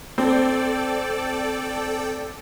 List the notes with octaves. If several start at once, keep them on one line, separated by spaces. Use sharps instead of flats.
C4 A4 D5 G5